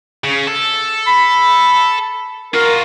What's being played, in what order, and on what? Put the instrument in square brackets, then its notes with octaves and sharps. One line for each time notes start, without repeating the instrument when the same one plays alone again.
[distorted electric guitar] C#3
A4
[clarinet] B5
[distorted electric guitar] F4 F#4 [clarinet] A#4